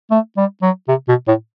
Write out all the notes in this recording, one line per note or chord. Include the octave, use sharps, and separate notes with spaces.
A3
G3
F#3
C3
B2
A2